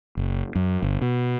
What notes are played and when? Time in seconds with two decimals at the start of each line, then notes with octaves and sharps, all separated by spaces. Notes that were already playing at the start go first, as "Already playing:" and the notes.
0.17 F#1
0.55 F#2
0.83 G1
1.01 B2